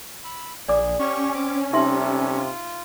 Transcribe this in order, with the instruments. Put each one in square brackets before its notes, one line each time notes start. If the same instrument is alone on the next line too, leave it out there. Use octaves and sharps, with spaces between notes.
[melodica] B5 E6
[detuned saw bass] A#1 [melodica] G#4 [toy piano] D5 D6
[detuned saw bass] C#4 [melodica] G4 C#5 C#6
[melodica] C4 D6
[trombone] C3 [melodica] G3 A4 [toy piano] D#4 E5 C6
[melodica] F4